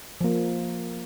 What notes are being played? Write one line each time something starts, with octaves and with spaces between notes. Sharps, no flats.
F3 A#3